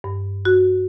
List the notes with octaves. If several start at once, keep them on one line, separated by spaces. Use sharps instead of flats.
G2
F#4